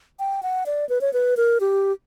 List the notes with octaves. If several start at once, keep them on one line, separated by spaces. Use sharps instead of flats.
G5
F#5
D5
B4
C#5
B4
A#4
G4